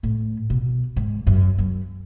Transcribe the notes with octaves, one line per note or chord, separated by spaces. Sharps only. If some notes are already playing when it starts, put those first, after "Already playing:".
A2
B2
G#2
F#2
F#2